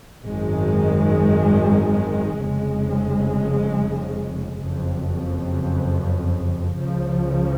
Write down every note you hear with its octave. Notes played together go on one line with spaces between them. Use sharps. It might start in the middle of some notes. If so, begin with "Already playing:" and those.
G#1 F#2 D#3 G#3
F1 F2 C#3 G#3
F#1 F2 C#3
C#2 C#3 F3